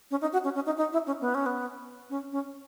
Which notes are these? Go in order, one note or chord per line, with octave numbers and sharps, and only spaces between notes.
C#4
D#4
F#4
C#4
C#4
D#4
D#4
E4
C#4
B3
C#4
B3
C#4
C#4